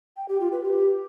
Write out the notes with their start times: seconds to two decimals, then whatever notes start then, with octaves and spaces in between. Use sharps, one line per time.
0.17 G5
0.28 G4
0.40 F4
0.52 B4
0.64 G4